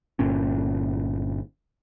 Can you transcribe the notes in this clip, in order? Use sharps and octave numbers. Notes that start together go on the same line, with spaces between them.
G1 A#2 C#4